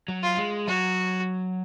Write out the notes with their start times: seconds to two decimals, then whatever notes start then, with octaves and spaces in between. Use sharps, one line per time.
0.08 F#3
0.23 F4
0.37 G#3
0.67 F#3 F#4